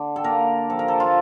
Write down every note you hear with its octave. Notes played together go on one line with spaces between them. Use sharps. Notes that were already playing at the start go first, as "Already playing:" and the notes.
Already playing: D3
A4
A#3 A#4
F3 A4
A#4
A4
F4